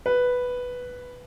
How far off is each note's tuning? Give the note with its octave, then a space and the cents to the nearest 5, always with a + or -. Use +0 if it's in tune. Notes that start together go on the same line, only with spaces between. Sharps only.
B4 +0